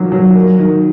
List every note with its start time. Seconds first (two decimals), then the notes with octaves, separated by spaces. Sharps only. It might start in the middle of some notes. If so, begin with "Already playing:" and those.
Already playing: A#2 D#3 F#3
0.12 F#3
0.35 A#3
0.59 D#3